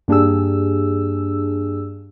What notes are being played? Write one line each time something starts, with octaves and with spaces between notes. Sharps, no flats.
G2 A#3 D4 G4 G#4 E6